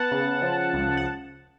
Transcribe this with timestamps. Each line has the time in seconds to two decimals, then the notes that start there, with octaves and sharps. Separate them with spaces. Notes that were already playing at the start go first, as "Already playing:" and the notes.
Already playing: B3 F#5 A5
0.12 C#3
0.42 F3
0.74 C#2
0.97 F#5